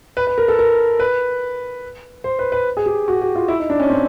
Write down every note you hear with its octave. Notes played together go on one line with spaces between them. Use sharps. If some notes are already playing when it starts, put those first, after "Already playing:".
B4
B4
A#4
A4
A#4
B4
C5
B4
B4
G#4
G4
F#4
G4
F4
E4
D#4
D4
C#4
C4